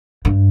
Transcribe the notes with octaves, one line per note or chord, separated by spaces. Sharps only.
G2